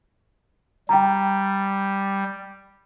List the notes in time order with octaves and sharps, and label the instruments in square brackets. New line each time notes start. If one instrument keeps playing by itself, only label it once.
[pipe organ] G3 [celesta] G5 A#5